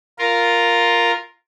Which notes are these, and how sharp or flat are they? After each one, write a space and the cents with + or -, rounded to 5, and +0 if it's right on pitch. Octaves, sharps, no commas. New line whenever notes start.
F4 +0 A#4 +0